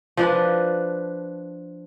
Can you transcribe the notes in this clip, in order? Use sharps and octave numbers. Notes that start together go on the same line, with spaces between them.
F3 D4 B4